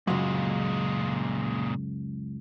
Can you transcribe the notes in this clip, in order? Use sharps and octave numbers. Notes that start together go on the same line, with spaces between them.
C#2 F#2 A#2 G#3